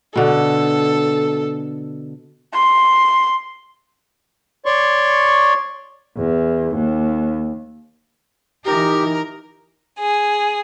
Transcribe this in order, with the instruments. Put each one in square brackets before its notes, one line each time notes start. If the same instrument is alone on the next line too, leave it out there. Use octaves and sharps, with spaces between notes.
[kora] B2 D3 [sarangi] A4
[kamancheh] C6
[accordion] C#5 D5 C6 C#6
[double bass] E2
D#2
[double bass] E3 D#4 [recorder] G4 [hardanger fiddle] A#4
[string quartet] G#4